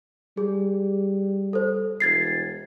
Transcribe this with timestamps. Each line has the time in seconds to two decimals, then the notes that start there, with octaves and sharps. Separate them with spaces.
0.37 G3 G#4
1.53 A4 C5
2.00 E1 G#6 A6 C7